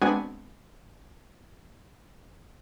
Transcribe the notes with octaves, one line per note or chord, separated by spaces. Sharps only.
G#3 B3 C4 D4 F#4 G#5